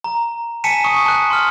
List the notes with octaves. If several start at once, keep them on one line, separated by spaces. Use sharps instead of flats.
A#5
G#5 A5 B6 C#7 D#7 E7
C#6 D#6
A5 F#6
C6 F6